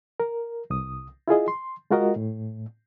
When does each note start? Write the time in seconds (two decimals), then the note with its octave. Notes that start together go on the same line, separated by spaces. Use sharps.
0.20 A#4
0.70 C2 D#6
1.28 E4 F4 G#4 D#5
1.48 C6
1.91 G#3 F4 F#4 A#4 D#5
2.16 A2